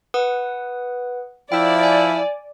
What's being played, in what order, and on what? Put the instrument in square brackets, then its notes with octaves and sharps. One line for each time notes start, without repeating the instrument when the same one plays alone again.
[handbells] B4 F#5 D#6
[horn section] F3 E4 [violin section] D5 [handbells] G5
[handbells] G#5